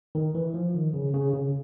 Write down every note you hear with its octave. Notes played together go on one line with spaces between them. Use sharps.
D#3
E3
F3
D#3
C#3
C#3
C#3